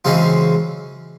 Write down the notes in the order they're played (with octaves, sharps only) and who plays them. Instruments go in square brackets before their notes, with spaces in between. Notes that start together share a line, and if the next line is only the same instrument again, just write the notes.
[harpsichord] F#2 C#3 E3 G#3 C4 F4